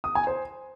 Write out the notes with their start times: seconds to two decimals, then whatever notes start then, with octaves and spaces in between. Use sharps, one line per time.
0.04 D#6
0.15 G#5
0.27 C5